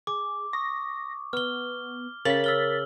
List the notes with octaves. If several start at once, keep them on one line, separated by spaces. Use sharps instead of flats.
G#4 D6
C#6 D#6 A#6
B3 F6 G7
C#3 A#4 A6 B6 F#7
E6 F6 G7